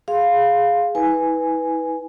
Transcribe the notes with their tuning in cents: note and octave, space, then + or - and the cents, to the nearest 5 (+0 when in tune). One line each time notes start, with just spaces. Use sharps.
G#4 +0 F5 +5 C6 +5
E4 -40 B4 +0 G#5 +0